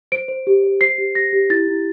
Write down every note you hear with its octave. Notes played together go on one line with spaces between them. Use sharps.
C5 D7
C5
G4
C5
C5 C7
G4
G4 A#6
G4
E4 A6
E4